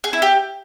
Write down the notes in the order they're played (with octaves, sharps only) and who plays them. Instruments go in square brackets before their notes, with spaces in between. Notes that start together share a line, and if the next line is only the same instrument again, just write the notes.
[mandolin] G#4
E4
G4